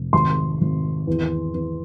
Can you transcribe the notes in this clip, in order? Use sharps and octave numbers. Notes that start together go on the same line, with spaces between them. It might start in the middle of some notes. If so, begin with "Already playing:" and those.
Already playing: F1
G#1 C6
G#1
E2
E2